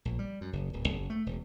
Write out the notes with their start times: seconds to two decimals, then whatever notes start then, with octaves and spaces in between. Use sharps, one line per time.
0.05 A#1
0.19 G3
0.41 F#2
0.53 F#1
0.73 D1
0.88 F#1
1.10 A3
1.26 E1